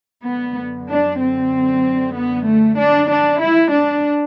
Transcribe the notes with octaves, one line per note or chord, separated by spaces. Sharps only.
F#2 D3 B3
D4
C4
B3
A3
D4
D4
E4
D4